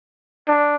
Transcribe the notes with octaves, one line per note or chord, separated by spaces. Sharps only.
D4